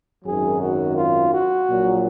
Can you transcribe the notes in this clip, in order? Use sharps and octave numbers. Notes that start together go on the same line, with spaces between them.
G#1 F#2 D#3 F#3 G#4
F#4
F4
F#4
A#1 A#2 F#3